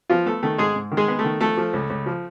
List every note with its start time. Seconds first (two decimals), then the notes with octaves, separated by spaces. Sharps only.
0.10 F3 B3 F4
0.26 A3 B3 A4
0.43 D#3 A3 A4
0.58 G#2 G#3 G#4
0.75 G#2
0.92 D#3
0.97 G#3 G#4
1.08 B3
1.19 A3 A4
1.25 D#3
1.41 F3 A3 A4
1.57 F3
1.73 C#2
1.90 C#2
2.06 F3